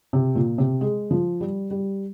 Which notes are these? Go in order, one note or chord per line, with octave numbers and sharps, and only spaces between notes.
C3
A#2
C3
G#3
F3
G3
G3